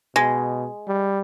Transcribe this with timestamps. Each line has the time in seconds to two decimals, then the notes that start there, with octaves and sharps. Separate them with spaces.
0.16 B2 G#3
0.87 G3